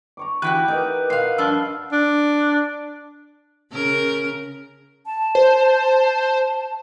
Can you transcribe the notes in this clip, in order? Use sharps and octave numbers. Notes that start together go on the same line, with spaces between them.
A#5 C#6 D6
E3 E4 F#4 G4 G5 F#6 D#7
D#4 A#4 B4 D5
A#2 F5 F#5 C7
G2 F3 D4 E6 F6
D4
C#3 A#4
A5
C5